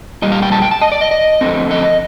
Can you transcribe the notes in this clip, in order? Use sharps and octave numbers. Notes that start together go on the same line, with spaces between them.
A#2 G3 D#5
F5
G5
A5
G5
A5
D#5
D5
D#5
D#5
F2 D3 A3 C4
D#5